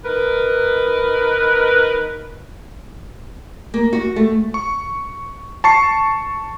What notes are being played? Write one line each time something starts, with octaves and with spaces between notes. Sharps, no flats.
D#4 A#4 B4
A#3
F#4
A3
C#6
A5 C#6 C7